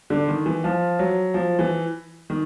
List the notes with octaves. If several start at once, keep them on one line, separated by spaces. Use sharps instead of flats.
D3
D#3
E3
F3
F#3
F3
E3
D#3